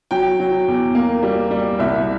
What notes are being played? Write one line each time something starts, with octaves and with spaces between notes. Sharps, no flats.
F#3 G5
F#3
E2
A#3
G3
G3
C2 E5